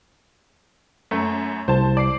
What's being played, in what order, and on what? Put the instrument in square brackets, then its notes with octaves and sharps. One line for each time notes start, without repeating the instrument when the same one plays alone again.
[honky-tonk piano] F#2 A3
[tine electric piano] C2 [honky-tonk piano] C5 A5
[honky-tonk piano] D5 C7